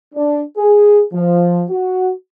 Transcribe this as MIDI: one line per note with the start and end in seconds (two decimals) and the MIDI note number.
0.14 0.41 62
0.57 1.02 68
1.13 1.64 53
1.70 2.11 66